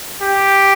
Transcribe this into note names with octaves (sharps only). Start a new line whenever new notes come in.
G4